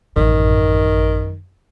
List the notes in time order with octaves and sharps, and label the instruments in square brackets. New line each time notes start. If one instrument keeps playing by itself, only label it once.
[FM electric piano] A1 [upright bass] F#2 [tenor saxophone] D#3